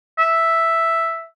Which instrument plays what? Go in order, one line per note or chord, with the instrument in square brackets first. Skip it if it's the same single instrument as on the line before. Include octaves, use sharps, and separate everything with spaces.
[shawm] E5